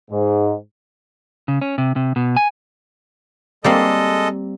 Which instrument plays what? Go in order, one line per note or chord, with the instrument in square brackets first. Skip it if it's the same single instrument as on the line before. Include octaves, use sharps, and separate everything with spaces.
[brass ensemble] G#2
[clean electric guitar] C#3
C#4
C3
C3
B2
G#5
[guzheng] G3 A#3 C4 [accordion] G#3 A4 D#5